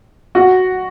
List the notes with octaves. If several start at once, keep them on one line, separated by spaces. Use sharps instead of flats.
F#4